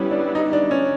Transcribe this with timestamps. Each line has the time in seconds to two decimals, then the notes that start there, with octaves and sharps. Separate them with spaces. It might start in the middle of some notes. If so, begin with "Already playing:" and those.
Already playing: G3 B3 C#4 E4
0.11 D4
0.35 D#4
0.53 D4
0.71 C#4